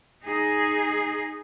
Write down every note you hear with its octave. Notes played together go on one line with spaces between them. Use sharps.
D#4 G#4